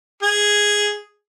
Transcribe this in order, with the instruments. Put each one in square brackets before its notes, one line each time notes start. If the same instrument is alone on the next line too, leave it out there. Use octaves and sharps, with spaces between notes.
[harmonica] G#4